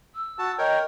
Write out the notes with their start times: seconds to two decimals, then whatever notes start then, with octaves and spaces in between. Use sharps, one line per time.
0.15 E6
0.39 F#4 A5
0.58 A#4 C#5 D#5 G5